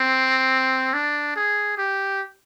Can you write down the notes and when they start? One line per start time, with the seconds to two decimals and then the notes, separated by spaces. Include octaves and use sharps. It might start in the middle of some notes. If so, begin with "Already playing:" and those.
Already playing: C4
0.94 D4
1.36 G#4
1.78 G4